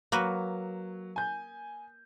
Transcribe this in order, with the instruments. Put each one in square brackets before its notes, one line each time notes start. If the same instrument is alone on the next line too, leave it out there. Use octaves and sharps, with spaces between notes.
[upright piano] F#3 [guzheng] A#3 F#4 B4
[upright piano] G#5 G6